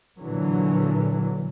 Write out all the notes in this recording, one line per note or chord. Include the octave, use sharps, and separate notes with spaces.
A#2 D3 E3 F#3